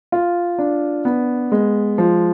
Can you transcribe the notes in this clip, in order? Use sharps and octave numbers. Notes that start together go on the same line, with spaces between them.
F4
D4
B3
G#3
F3